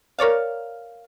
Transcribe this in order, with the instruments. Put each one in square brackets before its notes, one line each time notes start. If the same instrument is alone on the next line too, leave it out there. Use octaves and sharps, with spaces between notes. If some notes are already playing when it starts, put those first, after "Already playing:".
[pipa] A#4 C#5 D5 F5